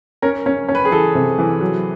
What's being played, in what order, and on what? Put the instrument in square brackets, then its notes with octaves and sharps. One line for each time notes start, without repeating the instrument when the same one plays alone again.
[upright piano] C#4 [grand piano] A#4
[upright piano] C#4
C#4
[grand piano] B4
G#4
[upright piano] E3 [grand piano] A4
[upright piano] C3
E3
F#3